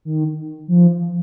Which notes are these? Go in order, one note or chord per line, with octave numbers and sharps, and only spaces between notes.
D#3
F3